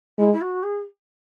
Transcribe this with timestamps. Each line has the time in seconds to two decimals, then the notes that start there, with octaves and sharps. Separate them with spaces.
0.18 G#3 E4
0.32 E4
0.41 F#4
0.63 G#4